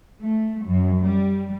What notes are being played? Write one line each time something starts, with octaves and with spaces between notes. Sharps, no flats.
A3
F#2
G3